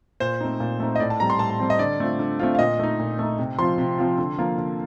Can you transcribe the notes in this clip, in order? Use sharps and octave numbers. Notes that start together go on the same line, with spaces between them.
A#2 C5
A3 C4 D#4
A#2
A3 C4 D#4
D#5
A2 D5
A5
G3 C4 A#5
C6
A2 A5
A5
G3 C4
D#5
D3 D5
A3 C4 F4
D3
A3 C4 F4
F5
A#2 D#5
A3 D#4
A#2
A3 D#4
C3
F3 C4 F4 C6
C3
F3 C4 F4
D3
F3 A#3 F4
D3